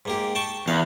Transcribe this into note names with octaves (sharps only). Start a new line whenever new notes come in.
G#2 A#3 G4
G5 A5 C#6
E2 F5